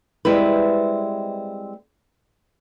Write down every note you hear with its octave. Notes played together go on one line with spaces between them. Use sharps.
G3 G#3 C4 E4 B4